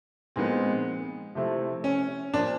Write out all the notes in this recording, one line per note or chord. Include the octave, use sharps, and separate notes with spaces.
A#2 F3 G#3 B3 C4 D#4
C3 F3 A3 C4 E4
C#4
A#2 F3 D4